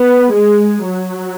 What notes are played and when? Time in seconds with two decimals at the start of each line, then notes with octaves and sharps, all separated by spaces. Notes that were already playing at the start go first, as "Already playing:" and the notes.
Already playing: B3
0.31 G#3
0.86 F#3